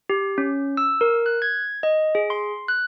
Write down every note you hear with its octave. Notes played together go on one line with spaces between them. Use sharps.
G4
C#4
E6
A#4
F#6
G#6
D#5
G#4
C6
F#6